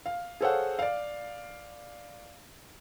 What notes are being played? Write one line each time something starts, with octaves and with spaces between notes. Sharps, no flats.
F5
G#4 A4 C5 C#5 F5 F#5
D5 F5